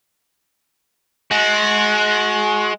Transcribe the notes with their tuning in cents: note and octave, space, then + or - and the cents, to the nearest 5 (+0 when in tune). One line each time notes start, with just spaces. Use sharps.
G#3 +25 F#4 -15